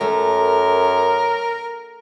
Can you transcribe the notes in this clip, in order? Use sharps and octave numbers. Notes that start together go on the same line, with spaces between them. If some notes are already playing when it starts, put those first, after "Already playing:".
F#2 A3 A#4